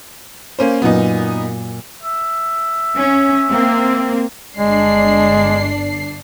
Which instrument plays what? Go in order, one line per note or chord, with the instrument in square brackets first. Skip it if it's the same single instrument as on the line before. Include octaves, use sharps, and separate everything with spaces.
[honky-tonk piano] A#3 C#4 C5
[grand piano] F#2 A#2 [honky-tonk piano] B3 D#4
[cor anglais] E5
[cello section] C#4
A#3 C4
[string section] G1 D4 C7 [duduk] G#3